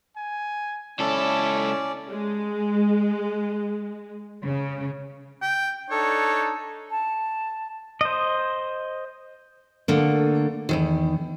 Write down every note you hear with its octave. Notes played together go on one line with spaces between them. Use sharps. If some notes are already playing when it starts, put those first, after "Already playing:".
G#5
C#2 C#4 E4 A4 D5
G#3
C#3
G5
D4 D#4 A4 C#5
A5
C5 D#5
D3 A3 A#3
E2 G#2 D#3